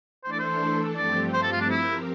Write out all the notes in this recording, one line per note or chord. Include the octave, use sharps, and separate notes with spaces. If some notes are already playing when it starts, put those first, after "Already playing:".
E3 A3 D4 A4 C5
D5
C5
G2 F3 A3 C4 G4 D5
C5
A4
F4
D4
F3 C4 E4 G4 A#4